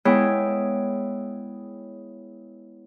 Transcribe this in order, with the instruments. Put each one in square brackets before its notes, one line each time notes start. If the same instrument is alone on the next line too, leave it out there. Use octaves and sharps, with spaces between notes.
[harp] G#3 B3 E4 G#4 C#5 G5